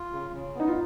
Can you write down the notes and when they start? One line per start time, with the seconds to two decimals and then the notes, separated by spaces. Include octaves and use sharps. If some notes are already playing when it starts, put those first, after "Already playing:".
Already playing: F4
0.13 C#3
0.34 C#3
0.55 B3 D#4
0.68 F4